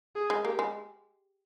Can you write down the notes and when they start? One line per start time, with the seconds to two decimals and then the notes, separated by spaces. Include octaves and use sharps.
0.16 G#4
0.30 G#3
0.45 A#3 G4
0.59 G#3